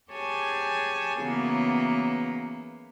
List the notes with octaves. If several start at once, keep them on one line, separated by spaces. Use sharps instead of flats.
G4 G#4 C#5 G#5 A5
C#3 E3 F#3 A#3 B3